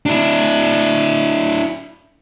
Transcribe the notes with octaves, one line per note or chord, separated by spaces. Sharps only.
D4 E4